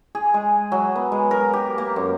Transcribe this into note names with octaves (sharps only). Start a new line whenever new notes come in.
G#4
G#3
F#3
B3
G#3
A#4
G4
A#3
F#2